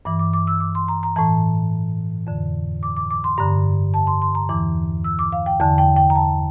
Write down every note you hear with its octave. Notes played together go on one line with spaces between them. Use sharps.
G2 E3 D6
D6
D6
E6
D6
C6
A#5
A#5
A2 E3 A5
F2 D3
D6
D6
D6
C6
G2 D3 A#5
A5
C6
C6
A#5
E2 E3 D6
E6
D6
F5
G5
E2 D3 A5
G5
G5
A#5
A5